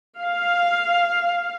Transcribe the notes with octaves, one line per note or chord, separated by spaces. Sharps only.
F5